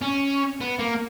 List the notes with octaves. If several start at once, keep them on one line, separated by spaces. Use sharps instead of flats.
C#4
B3
A#3